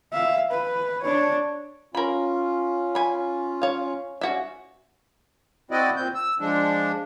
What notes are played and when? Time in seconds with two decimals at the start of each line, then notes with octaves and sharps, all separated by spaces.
0.13 E5 F5
0.51 B4
1.02 D4 C#5
1.95 C#4 F4 A#4 B5
2.95 G#5 B5
3.62 C#5 F5
4.21 C#4 F#4 E5
5.71 C4 E4 F#4 D5 D#5
5.97 A#2 C4 G6
6.15 E6
6.40 F3 G#3 D4